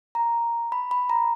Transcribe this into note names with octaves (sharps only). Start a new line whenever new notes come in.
A#5
B5
B5
A#5